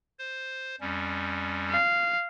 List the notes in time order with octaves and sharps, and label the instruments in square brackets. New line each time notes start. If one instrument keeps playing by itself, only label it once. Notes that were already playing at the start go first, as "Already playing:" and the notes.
[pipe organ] C5
F2 G3 C#4
[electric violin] F5